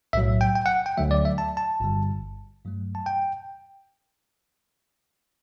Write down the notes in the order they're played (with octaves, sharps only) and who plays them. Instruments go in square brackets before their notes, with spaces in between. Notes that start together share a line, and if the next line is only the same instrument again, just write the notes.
[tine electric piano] B1 A2 F#3 E5
G5
G5
F#5
G5
D2 D3 F#3 A3 E5
D5
E5
A5
A5
G1 G2 D3 G3
G2 F#3 A3
A5
G5